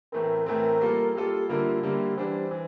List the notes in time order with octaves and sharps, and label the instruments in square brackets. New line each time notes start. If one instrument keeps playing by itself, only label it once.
[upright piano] A2 E3 A3 C4 [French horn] A#4
[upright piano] A2 E3 A3 C4 [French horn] A#4
[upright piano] G3 A#3 F4 A4
[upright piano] G3 A#3 F4 A4 [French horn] G4
[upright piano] D3 G3 A#3 E4 A#4 [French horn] F4
[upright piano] D3 G3 A#3 E4 A#4 [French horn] G4
[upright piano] E3 G3 D4 [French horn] C5
[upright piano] E3